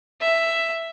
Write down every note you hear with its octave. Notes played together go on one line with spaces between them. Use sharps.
E5